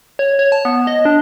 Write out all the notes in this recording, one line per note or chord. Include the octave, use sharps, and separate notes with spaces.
C#5
C#5
A5
B3
D#5
D4